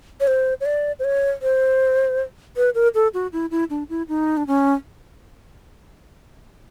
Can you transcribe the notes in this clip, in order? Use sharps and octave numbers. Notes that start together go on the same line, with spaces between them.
C#5
C5
C#5
D5
C5
C#5
C5
B4
A#4
A4
F#4
E4
E4
D4
E4
D#4
D4
C#4